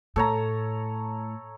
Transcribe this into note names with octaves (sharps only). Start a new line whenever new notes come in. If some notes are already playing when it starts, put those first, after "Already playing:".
A2 A4 C#5 A#5